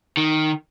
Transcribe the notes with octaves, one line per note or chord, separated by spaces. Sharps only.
D#3